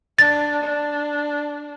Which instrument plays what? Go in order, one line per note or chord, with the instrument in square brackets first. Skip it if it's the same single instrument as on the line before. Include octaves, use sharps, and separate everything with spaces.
[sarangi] D4 [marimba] A6
[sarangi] D4